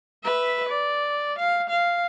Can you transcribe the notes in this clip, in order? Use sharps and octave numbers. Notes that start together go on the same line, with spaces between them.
B4 E5
D5
F5
F5